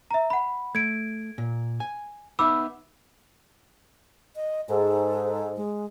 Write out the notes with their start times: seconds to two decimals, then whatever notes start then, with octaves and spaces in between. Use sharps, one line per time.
0.11 E5 A#5
0.30 F#5 B5
0.75 A3 G#6 D7
1.38 A#2
1.80 G#5
2.39 B3 D#4 E5 B5 D6 E6
4.36 D#5
4.69 G#2 A4
5.57 G#3